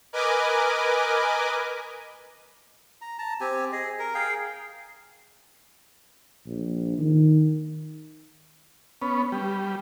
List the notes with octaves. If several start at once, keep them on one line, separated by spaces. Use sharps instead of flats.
A#4 B4 D#5 G#5 D6
A#5
A5 A#5
C4 G4 G#5
G#4 D#5
A#4
G#4 F5 G5
A#1
D#3
B3 C#4
G3